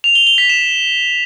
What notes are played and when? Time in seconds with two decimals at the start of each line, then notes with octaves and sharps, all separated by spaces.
0.04 F7
0.15 G7
0.27 G7
0.38 B6
0.49 E7